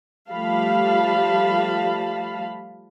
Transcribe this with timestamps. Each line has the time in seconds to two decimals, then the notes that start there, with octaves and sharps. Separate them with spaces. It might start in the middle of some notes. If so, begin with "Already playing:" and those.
0.29 F3 G3 A3 F5 A5 B5